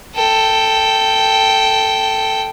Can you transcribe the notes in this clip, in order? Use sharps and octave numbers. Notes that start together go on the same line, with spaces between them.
A4 G5